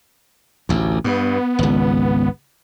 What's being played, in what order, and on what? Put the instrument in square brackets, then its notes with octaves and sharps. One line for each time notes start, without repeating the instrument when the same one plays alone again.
[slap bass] A1 D2
[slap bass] G2 [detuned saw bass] B3
[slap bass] G#1 C#2